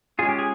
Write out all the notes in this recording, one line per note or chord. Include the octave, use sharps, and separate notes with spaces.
G#3 C#4 F4 G#4
G4
G#4